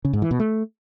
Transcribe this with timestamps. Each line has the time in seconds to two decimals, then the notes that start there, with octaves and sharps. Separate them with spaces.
0.05 C#3
0.13 G#2
0.22 E3
0.31 B2
0.40 A3